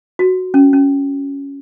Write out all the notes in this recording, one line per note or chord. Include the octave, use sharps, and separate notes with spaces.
F#4
C#4
C#4